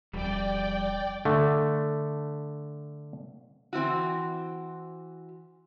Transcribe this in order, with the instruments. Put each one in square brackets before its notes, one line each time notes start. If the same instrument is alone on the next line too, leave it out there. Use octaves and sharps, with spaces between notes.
[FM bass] D#1 [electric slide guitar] F2 G3 [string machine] D5 G5
[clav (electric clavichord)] D3 A3
[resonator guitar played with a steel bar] E3 C4 E4 F#4